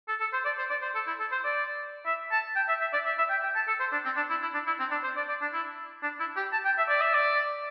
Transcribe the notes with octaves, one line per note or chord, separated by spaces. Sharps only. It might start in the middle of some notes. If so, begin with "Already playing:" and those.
A4
A4
C5
D5
C5
D5
C5
A4
E4
A4
C5
D5
E5
A5
G5
E5
E5
D5
E5
E5
G5
G5
A5
A4
C5
D4
C4
D4
E4
E4
D4
E4
C4
D4
C5
D5
D5
D4
E4
D4
E4
G4
A5
G5
E5
D5
E5
D5